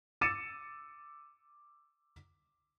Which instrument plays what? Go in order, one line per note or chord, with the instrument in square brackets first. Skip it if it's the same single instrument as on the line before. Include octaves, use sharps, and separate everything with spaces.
[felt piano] D6 E6 A6 C#7 D#7 E7